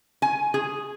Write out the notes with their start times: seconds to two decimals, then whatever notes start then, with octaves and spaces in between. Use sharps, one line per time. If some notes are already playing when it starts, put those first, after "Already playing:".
0.22 G#5
0.54 G#4